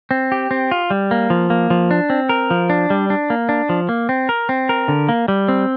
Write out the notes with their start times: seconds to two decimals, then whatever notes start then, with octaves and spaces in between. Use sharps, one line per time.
0.11 C4
0.32 G4
0.51 C4
0.71 F4
0.90 G3
1.11 A#3
1.30 F3
1.50 A#3
1.70 F3
1.91 D4
2.10 C4
2.29 A#4
2.50 F3
2.70 D4
2.90 G3
3.10 D4
3.30 A#3
3.49 D4
3.69 F3
3.89 A#3
4.09 C4
4.29 A#4
4.49 C4
4.69 A#4
4.88 D3
5.09 A#3
5.28 G3
5.48 C4